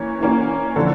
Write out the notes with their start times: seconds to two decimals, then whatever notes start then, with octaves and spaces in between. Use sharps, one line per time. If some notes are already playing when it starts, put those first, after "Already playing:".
Already playing: E3 A#3 C#4
0.20 E3 A#3 C#4
0.76 D3 F3 A#3 D4 A4